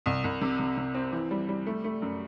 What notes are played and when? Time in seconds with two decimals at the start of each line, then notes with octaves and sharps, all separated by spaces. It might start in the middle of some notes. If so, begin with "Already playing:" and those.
0.06 C2
0.24 C2
0.41 C3
0.59 C3
0.77 C3
0.94 C4
1.12 E3
1.31 G3
1.49 G3
1.66 A3
1.84 A3
2.02 F#2